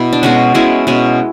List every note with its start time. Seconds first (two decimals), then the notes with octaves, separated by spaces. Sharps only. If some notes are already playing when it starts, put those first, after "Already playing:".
Already playing: B2 E4
0.13 D4
0.23 B2 G#3 C#4 F#4
0.54 B2 G#3 C#4 E4
0.87 B2 G#3 C#4